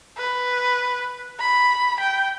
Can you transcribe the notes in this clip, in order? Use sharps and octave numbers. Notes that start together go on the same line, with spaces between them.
B4
B5
G5